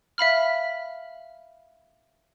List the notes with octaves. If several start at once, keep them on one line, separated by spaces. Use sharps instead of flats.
E5 F5 B5 F6